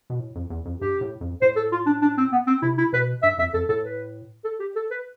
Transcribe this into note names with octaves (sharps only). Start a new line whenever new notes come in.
B2
A2
F2
E2
F2
G2 G4
A2
F2
A2 C5
A4
F4
D4
D4
C4
B3
C4
C3 E4
E4
B2 B4
G2 E5
F2 E5
F2 A4
A2 A4
B4
A4
G4
A4
B4